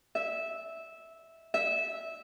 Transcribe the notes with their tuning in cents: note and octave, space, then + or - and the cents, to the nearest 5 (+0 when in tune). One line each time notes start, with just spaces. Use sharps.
E5 -10
E5 -15